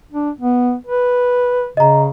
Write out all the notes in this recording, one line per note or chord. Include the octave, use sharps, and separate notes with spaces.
D4
B3
B4
C#3 D#5 A#5